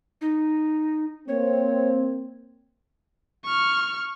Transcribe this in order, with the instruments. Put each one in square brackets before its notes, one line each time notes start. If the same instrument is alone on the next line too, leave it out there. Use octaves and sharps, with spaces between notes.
[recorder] D#4
[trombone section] A#3 C4 [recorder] C#5
[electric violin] C#6 F6